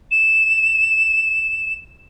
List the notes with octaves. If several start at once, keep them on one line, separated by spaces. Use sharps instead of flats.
E7